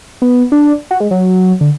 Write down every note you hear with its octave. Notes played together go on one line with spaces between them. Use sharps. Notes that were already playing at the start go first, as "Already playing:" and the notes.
B3
D4
F#4
G#3
F#3
D3